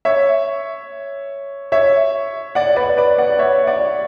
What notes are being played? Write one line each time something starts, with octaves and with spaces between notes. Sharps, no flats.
C#5 E5
C#5 E5
D5 F#5
B4 D5
B4 D5
D5 F#5
C#5 E5
D5 F#5